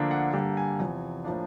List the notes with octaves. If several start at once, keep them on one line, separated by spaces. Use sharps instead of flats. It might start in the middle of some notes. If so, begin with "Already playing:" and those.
Already playing: D2 D3 F3 A#3 D4
F#5
G2 D3 G3 A#3 G5
G#5
E2 C3 F3
A2 F3 A#3 D4